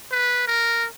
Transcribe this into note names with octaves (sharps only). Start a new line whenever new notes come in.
B4
A#4